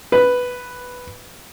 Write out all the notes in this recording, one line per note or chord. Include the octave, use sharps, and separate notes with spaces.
B4